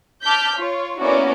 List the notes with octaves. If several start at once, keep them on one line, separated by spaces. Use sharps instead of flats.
A5 D6 F6 G6 B6
F4 C#5
A#3 B3 C#4 E4 F#4 D5